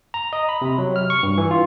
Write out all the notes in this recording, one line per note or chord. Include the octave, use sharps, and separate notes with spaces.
A#5
D#5
B5
C3
F#3
F6
C#6
G2
E3
F4